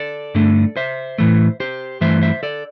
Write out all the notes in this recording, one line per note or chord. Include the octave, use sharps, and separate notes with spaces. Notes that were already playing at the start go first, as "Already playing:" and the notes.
Already playing: A4 D5
G2 D3 A3
C5 E5
A2 E3 A3
G4 C5
G2 E3 A3 C5 E5
C5 E5
A4 D5